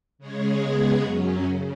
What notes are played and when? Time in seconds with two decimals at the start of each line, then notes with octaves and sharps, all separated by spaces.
0.18 C#3 G#3 C#4 G#4
0.60 C#3 G#3 B3 G#4
1.01 F#2 F#3 C#4
1.43 C#3